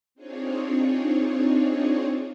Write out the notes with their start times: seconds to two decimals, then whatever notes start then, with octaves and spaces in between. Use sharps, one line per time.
0.15 C4 D4 D#4 F4 G#4 C#5